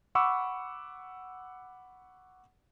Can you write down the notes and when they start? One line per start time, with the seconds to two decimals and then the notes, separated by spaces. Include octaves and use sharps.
0.15 F#5 B5 C#6 D6 E6